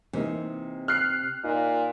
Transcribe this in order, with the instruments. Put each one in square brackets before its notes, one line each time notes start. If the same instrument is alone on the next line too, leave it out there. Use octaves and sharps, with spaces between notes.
[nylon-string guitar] C3 [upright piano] E3 A#3 D#4
[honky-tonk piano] F6 F#6 C7
[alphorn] A#2 [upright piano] D#4